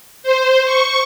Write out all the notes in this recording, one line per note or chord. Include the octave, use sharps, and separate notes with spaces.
C5
C#6